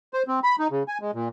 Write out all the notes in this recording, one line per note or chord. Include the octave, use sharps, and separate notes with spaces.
C5
C4
B5
D#4
C#3
G#5
G#3
A#2